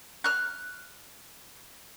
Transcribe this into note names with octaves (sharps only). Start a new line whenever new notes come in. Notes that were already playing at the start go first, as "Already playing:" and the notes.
F6 F#6